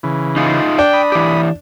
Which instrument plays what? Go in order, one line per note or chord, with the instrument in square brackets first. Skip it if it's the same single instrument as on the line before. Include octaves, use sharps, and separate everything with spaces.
[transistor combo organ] C#3 E3
[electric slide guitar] D#4 F4 G#4
[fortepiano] D4 [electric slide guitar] G5
[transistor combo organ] B5 D#6
[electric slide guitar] E3 G4